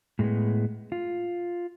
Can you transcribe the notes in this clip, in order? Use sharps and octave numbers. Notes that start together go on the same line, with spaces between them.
A2 G#3 A#3 B3
F4